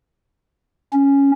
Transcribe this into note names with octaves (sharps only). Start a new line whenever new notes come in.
C#4